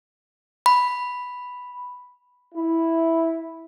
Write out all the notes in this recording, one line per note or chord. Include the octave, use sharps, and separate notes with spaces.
B5
E4